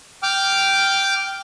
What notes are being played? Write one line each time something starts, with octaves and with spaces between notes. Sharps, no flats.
G5 D6 F6